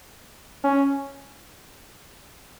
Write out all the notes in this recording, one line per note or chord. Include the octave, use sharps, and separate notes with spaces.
C#4